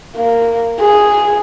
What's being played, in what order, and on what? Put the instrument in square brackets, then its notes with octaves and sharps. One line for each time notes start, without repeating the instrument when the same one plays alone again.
[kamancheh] A#3
G#4